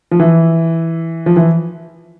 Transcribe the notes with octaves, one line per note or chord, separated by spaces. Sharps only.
F3
E3
F3
E3